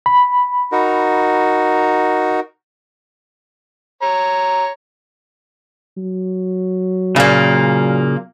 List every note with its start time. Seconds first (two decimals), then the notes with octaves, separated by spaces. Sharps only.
0.06 B5
0.72 D#4 F#4 A#4
4.02 C#5 A#5
5.97 F#3
7.16 A#2 C#3 A#3